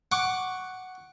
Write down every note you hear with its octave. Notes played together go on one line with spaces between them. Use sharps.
F#5 C#6 D6